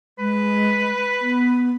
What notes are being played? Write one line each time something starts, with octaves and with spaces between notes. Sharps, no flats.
G#3 B4
B3